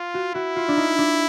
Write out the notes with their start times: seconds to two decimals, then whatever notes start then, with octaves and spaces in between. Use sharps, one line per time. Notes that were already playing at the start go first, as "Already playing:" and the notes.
Already playing: F4
0.14 F#4
0.34 E4 F#4
0.56 F4
0.68 D4
0.77 D#4
0.98 D4